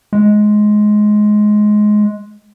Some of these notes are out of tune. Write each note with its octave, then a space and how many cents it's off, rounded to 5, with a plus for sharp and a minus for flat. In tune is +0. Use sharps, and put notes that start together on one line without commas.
G#3 +15